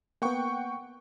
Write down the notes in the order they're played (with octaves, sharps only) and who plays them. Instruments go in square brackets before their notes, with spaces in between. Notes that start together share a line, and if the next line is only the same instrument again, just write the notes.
[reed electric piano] A#3 B3 [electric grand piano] F#5 G5 C#6